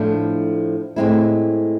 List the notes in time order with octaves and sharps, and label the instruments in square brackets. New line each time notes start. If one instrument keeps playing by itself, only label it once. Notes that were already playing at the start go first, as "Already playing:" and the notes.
Already playing: [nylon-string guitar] A2 F3 A3 D4
A2 G#3 C4 E4